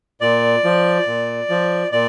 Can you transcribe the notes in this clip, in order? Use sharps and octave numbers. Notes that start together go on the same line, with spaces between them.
A#2 D5
F3
A#2
F3
A#2 D5